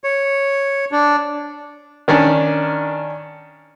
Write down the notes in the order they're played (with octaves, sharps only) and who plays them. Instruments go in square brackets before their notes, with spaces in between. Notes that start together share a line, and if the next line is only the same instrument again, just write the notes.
[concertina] C#5
D4
[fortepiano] D#3 C#4 D4